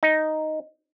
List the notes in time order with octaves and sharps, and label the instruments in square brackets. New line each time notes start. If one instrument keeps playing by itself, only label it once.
[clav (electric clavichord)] D#4